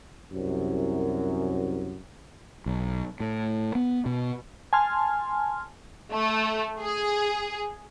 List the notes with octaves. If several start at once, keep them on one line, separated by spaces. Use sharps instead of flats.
C2 F#2
B1
A2
B3
B2
G#5 A5 C6 F6
A3
G#4